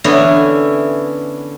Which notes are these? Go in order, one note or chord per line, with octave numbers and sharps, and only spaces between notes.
D3 E3 B3 C#4 E4